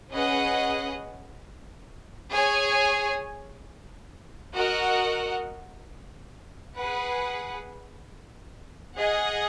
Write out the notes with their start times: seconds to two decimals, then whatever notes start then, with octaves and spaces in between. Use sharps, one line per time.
0.11 C#4 G#4 B4 D#5 F#5
2.32 G#4 C#5 G#5
4.54 F#4 A#4 D#5 F#5
6.75 G#4 B4 F#5
8.97 G#4 D#5 F#5